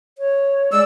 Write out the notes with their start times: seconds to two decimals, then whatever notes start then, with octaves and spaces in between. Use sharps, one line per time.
0.18 C#5
0.72 G#3 D5 E6